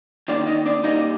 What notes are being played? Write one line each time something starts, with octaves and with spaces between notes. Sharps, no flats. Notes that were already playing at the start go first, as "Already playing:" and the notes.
D#3 A#3 D4 D5
D#4 D#5
D4 D5
A#2 G3 A#3 D#4 D#5